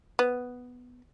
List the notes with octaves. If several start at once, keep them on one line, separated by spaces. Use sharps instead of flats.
B3